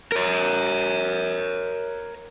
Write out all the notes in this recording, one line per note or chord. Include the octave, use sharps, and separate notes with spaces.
A#4 C#5